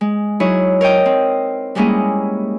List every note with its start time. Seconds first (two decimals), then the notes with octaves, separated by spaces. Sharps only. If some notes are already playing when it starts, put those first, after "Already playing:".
0.01 G#3
0.40 F#3 D#4 E4 G#4 C#5
0.81 A#4 C#5 D#5 G5
1.06 C4
1.75 G3 G#3 A#3 C#4 E4 G#4